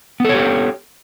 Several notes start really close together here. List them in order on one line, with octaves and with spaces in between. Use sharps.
B3 A4 C#5 G4